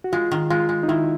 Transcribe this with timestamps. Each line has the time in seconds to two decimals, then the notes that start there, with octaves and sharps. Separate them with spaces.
0.04 F#4
0.13 G#3 F4
0.31 D#3
0.50 G#3 F4
0.69 G#3
0.83 D#4
0.89 D#3 E4